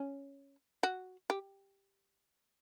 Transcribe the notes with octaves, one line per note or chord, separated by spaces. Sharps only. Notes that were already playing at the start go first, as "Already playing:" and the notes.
Already playing: C#4
F#4
G4